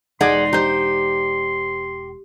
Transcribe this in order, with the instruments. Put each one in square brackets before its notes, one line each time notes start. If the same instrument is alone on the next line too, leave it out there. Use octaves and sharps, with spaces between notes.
[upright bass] E1 [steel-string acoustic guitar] D#4 [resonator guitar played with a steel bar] G#4 D5 F#5 [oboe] C6
[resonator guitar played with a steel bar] D#4 C5 [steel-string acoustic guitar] G4